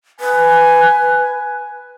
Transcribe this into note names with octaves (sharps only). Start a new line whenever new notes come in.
B4 G#5